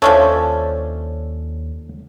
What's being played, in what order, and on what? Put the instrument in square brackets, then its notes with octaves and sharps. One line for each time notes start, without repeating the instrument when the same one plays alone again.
[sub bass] D#2 [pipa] F3 C#4 D4 [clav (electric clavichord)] A4 C#5 E5